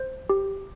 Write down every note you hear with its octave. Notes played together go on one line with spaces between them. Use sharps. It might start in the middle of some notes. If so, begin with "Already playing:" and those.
Already playing: C5
G4